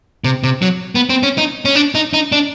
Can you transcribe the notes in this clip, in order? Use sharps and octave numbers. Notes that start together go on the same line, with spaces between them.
C3
C3
F#3
B3
C4
C#4
D#4
C#4
D4
D#4
D#4
D4